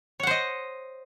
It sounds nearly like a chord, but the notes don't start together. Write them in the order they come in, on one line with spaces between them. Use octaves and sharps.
C#5 F#5 C5 D#5